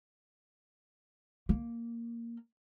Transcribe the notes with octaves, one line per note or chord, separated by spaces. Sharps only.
A#3